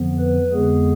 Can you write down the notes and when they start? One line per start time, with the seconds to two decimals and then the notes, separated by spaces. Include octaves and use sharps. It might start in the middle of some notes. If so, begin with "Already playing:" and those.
Already playing: F2 D3 F3 B3
0.19 B4
0.52 F2 D3 G#3 B3 G#4